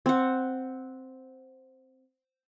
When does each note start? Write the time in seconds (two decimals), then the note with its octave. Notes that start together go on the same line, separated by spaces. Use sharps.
0.06 C4 F#5